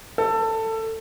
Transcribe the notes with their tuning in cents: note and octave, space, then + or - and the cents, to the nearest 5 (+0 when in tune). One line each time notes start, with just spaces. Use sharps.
A4 +20